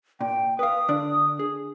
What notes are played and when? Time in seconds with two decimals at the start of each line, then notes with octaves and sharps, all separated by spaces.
0.21 A#2 G5
0.59 B4 F5 D#6
0.88 D3 D4 D5
1.39 G#4